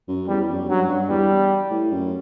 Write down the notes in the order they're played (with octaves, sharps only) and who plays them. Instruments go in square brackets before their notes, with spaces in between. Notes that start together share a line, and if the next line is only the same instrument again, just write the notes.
[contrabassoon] F#2
[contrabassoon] E2 [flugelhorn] G3
[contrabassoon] F#2
[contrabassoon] G2 [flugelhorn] F#3
[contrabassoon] G2
[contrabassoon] E2 [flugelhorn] G3
[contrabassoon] A2
F#2